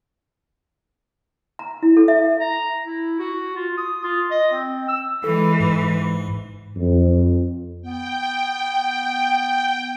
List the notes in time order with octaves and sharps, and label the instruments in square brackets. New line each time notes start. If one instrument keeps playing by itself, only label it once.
[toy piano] A#5
E4
A4
E5
[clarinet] A#5
E4
F#4
F4
D#6
F4
D#5
C4
E6
[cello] E3 G#3 [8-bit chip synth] A4
[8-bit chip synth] G#2
[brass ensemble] F2
[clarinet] B3 [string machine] G5